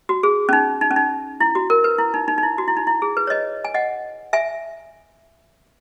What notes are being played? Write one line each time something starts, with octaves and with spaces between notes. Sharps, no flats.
F#4
G#4
C#4
D#4
D#4
C#4
D#4
E4
F#4
A#4
B4
E4
D#4
D#4
D#4
E4
F#4
E4
D#4
E4
G#4
B4
C#5
B4 D#5
G#5
D#5 F#5
E5 G#5